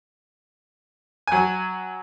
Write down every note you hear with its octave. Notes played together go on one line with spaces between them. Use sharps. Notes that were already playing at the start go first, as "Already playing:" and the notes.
F#3 G#5